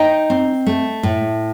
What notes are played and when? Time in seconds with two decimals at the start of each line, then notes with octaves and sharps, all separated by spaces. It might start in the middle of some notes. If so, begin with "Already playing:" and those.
Already playing: D#4 D#5 G5
0.30 C4
0.67 A3
1.03 A2